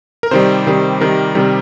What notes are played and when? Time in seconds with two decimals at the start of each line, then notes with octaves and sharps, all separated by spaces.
0.23 A#4
0.31 C3 D#3 G3 C5
0.66 C3 D#3 G3
1.01 C3 D#3 G3 A#4
1.35 C3 D#3 G3